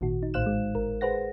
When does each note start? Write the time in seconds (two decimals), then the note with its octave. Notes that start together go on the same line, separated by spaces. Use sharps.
0.01 G#1 A#2 D#3 F#4
0.23 D#4
0.34 A#1 A2 C5 F5 F#6 E7
0.46 G#3
0.75 G#1 A#4
1.01 G#4 B4 C5 F#5 A#6